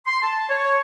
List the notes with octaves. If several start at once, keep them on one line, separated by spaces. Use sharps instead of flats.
C6
A5
C#5